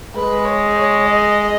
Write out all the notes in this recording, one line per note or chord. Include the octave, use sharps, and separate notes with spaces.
G#3 B4
C#5
C#5
D#5